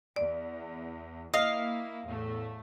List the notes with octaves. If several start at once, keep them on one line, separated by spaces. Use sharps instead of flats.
E2 D5
A#3 E4 D#5 F5
E2 A2 A3